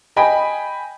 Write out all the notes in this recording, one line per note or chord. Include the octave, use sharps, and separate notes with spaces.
D#5 G5 G#5 B5